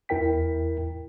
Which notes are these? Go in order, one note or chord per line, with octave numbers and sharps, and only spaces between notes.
E2 E4 A#4 G5 B6